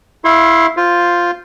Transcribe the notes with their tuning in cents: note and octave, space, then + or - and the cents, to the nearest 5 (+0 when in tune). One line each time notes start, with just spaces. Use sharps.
E4 +0 F5 +0 C6 +35
F4 +0 C5 +0